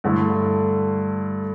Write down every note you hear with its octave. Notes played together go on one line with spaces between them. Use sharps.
G2 D3 A3 E4